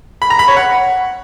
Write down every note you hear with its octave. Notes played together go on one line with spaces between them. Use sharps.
B5
A#5
B5
C#5
F#5